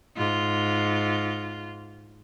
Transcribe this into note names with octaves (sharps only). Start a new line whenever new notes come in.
G#2 F4